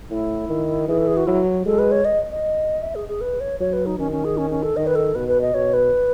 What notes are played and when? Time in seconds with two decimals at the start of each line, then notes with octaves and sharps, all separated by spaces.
0.10 A2 E4
0.49 D#3
0.88 E3 G#4
0.98 A4
1.07 G#4
1.17 F#4
1.27 F#3 E4
1.66 G#3 A4
1.79 B4
1.91 C#5
2.05 D#5
2.31 D#5
2.82 E5
2.95 G#4
3.09 G#4
3.21 B4
3.40 C#5
3.60 F#3 C#5
3.73 B4
3.86 D#4
3.99 D#3 C#4
4.12 C#4
4.25 G#4
4.37 C#4
4.51 C#4
4.63 A4
4.76 D#3 D#5
4.87 B4
4.95 A4
5.15 B2 B4
5.28 B4
5.41 D#5
5.54 B2 C#5
5.74 B4